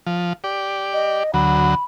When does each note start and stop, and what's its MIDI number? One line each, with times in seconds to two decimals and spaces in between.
0.06 0.33 53
0.44 1.23 67
0.44 1.23 74
0.93 1.31 75
1.34 1.75 38
1.34 1.75 54
1.34 1.84 83